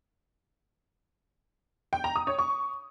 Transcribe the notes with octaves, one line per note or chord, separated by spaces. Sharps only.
G5
A#5
D#6
C#5
C#6